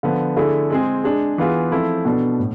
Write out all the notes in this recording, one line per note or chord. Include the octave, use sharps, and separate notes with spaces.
D3 F3 B3
D3 A3 E4 G#4
G#3 C4 G#4
G#3 D4 G#4
E3 B3 F4 G#4
F3 A3 C4 E4
B2 B3 D4 A4
A2